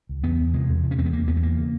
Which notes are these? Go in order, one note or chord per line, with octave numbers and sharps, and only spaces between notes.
C#2
E2 B3
E2
C3 G#3
E2
C3
C#4
E2 C4
B3
E2 A#3
E2 B3
A3
E2 A#3
C#3